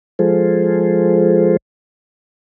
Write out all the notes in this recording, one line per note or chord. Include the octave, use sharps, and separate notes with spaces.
F3 G#3 F4 G#4 A4 C5